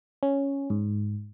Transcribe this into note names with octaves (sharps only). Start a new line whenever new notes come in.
C#4
G#2